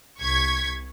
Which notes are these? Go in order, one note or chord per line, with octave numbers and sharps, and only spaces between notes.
C2 C#6 G#6 B6